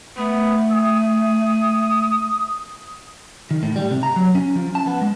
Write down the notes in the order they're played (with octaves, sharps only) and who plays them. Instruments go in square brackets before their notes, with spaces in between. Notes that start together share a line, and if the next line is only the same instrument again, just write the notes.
[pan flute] A3 [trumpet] B3
[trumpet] D#6
[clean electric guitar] D#3
A2
G3
C3
A#5
F#3
C#4
F3
A5
B3
G#3